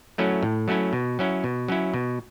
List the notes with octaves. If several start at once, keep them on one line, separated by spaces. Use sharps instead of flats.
F#3 A3 C#4 E4
A2
F#3 A3 C#4 E4
B2
F#3 C#4 E4
B2
F#3 C#4 E4
B2